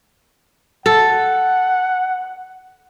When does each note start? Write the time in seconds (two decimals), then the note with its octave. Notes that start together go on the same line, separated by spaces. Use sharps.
0.86 A4 F#5